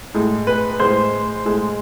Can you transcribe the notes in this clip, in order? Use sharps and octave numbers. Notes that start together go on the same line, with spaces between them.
A2 G#3
B4
A2 G#3 C5
A2 G#3